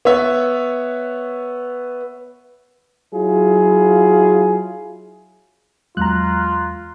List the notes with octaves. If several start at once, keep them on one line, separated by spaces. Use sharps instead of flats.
B3 C#5 E5
F#3 E4 F4 G#4
E2 F#3 G#3 F4 A#5 F#6